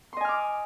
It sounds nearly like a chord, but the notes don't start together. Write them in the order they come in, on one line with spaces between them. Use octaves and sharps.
C6 D#5 G#5 F6 D6